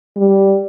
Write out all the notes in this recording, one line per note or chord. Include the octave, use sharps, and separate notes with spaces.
G3